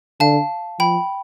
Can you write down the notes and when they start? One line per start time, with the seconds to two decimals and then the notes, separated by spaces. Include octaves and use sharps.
0.20 D3 F5 A5
0.79 F3 G5 B5